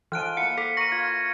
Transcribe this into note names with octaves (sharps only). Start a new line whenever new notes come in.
E3 F3 G#3 F4 F6 F#6 D7 D#7
A#3 E4 F#5 C#7
A4 B6
A#4 C#6 A#6 D#7
F4 G#6